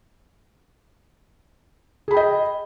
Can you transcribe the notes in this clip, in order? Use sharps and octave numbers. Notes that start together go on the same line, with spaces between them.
G#4 D#5 G5 B5